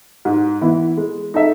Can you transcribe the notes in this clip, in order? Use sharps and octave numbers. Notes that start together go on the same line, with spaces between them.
G#2
E3 B3 E4
G#3
D#4 A4 E5